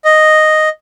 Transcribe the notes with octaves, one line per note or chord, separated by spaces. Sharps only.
D#5